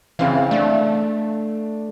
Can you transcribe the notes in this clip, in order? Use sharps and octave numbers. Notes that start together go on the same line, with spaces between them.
C#3 E3 C4 F5
A3 D4